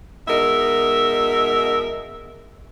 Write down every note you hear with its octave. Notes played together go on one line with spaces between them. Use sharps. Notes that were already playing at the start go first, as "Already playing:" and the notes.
B2 G#3 D#4 A#4 E5